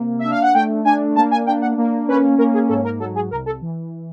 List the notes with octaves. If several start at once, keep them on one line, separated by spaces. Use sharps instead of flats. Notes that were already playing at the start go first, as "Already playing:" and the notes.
Already playing: C3 A#3
D4 E5
F5
F#5
A3 G5
D4 G#5
A#3 A5
G#5
D4 G5
F#5
A#3
C#4 B4
A#3 A#4
G#4
G#2 A4
A#4
F#3 A4
G#4
C2 A#4
A4
E3